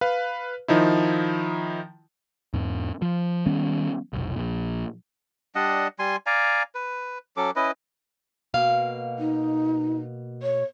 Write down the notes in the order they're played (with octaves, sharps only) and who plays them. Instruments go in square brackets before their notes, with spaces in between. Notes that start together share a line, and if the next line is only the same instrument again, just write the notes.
[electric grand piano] B4 F5
D#3 F3 D#4 E4
[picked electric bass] E2 G#2
F3
D#3 G3 B3 C#4
F1 B1
A#1
[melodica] G3 D4 D#5 F#5
G3 G#5 C6
D5 F5 G#5 A#5
B4
F#3 C#4 A4 D6
C#4 E4 B4 D#5
[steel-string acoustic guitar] B2 A#3 F5
[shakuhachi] D#4
C#5